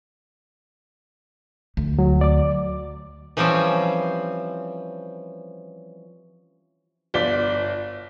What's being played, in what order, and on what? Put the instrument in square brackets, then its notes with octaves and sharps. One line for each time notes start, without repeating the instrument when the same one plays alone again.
[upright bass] D2
[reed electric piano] F#3
D5 D6
[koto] E3 F3 G3 C4 C#4
[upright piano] G1 F4 D5 B6 G7